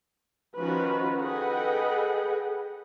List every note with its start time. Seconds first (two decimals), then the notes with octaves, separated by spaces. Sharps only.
0.57 D#3 F3 C#4 F#4 B4
1.19 G#4 A4 B4 D#5 F#5 G5